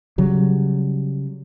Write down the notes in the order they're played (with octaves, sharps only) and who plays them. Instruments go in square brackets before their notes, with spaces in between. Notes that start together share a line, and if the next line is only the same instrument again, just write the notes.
[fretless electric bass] C#3 F#3 G3